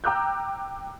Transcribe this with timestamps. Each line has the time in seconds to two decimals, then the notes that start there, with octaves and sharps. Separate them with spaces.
0.04 G5 A#5 D6 E6 F#6 G6